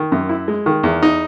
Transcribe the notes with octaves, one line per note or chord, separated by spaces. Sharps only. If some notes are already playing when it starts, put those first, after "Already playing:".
Already playing: D#3
F#2
E4
G#3
D#3
E2
D#4